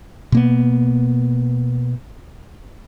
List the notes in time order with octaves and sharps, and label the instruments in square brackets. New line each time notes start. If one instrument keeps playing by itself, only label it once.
[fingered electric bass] B2 A#3 B3